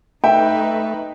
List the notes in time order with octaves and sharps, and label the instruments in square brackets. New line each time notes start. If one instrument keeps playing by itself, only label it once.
[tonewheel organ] A3 [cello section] D#4 B4 [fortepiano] E5 [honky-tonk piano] G5